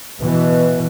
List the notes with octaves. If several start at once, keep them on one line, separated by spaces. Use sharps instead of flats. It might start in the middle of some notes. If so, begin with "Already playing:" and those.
B2 E3